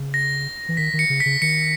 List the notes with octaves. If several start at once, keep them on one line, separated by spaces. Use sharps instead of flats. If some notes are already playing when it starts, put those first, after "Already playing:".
Already playing: C#3
A#6
E3
D#3 B6
D#3
C#7
C#3
B6
C#3
D#3 C#7